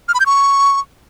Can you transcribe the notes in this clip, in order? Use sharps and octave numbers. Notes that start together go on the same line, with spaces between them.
F6
B5
G6
C#6